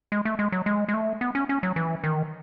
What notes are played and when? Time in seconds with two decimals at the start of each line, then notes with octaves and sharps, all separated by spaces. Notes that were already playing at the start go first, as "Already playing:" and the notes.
0.12 G#3
0.25 A3
0.39 G#3
0.52 F#3
0.66 G#3
0.89 G#3
0.94 A3
1.21 B3
1.35 C#4
1.49 C#4
1.63 F#3
1.76 E3
2.04 D#3